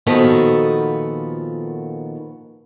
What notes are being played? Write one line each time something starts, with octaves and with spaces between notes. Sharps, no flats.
A#2 D#3 F3 B3 F#4 A4